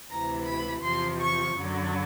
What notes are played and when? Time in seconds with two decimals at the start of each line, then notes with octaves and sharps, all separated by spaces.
0.11 D2 C3 E3 A#5
0.47 B5
0.83 E2 C3 F3 C6
1.20 C#6
1.56 F#2 D3 F#3